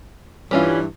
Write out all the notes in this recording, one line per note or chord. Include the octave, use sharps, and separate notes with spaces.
G2 E3 G3 C#4 F4